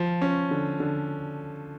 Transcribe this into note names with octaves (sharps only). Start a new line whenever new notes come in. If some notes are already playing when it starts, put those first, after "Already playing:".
Already playing: F3
C#4
D3
D3